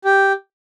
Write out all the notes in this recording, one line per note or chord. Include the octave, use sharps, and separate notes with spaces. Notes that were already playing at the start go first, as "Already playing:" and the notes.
G4